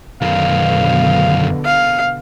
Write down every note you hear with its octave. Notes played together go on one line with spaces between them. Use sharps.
F#2 B2 D3 D#3 F5
F5